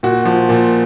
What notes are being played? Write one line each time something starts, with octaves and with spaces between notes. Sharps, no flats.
A#2 F#4
F3
A#2